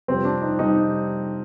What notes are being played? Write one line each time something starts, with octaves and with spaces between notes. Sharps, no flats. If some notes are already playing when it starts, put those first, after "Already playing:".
F2 C3 G3 C4
D4
D#4
C3 G3 D#4